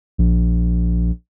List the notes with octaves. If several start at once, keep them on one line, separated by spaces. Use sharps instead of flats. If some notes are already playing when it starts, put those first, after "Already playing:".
A#1